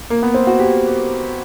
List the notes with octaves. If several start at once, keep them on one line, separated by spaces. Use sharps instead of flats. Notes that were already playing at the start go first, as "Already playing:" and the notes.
A#3
B3
C4
F#4
G4